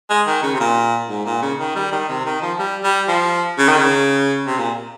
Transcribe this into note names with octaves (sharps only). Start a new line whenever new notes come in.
G#3
D#3
C#3
C3
A#2
G#2
A#2
C#3
D#3
G3
D#3
C3
D#3
F3
G3
G3
F3
C#3
D#3
C#3
C3
A#2